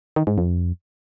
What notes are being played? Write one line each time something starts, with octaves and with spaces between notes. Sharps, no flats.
D#3
G#2
F2